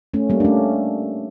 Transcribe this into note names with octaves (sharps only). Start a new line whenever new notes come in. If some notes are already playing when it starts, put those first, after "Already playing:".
A3 C#4
G3 A#3
D4
A3 C#4